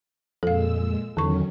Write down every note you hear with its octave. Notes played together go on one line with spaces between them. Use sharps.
F2 A#2 G#3 A4 F5 E6
E2 D3 D#3 F#3 C#4 C#6